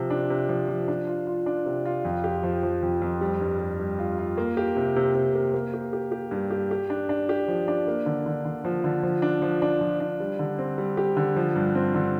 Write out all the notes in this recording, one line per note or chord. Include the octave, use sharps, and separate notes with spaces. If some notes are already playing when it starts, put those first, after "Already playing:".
Already playing: C3 F3
D4
C3
F3
F3
D4
F4
F4
D4
C3
F4
F2
G4
F3
F3
F2
F2
G3
G2
G3
G3
F4
F4
A#3
G4
C3
C3
C3
A#3
A#3
G4
G4
G4
G2
G4
G4
D4
D4
G4
F3
D4
A#3
D3
D3
D3
F3
D3
F3
D4
F3
D4
F3
D4
G3
D3
C4
G3
G4
D3
F3
G2
C4
D3